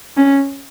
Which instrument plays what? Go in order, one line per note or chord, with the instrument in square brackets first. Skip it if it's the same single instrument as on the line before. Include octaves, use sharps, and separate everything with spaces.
[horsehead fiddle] C#4